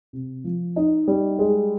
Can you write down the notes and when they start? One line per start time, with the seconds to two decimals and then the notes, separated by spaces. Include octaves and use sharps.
0.13 C3
0.44 F3
0.76 D#4
1.08 G3
1.39 G#3